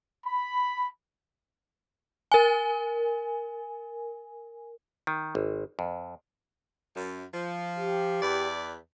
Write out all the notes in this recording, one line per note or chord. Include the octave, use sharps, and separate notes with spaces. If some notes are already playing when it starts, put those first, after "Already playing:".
B5
A#4 G#5
D#3
G#1
F2
F#2
F3
G4
E2 B4 D5